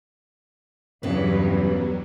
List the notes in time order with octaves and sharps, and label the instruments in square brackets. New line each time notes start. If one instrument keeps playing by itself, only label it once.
[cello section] E2 G2 [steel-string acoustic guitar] C#3 B4 [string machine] F#3 G3 [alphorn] B3